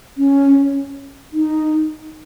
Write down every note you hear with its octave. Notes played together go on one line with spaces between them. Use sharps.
C#4
D#4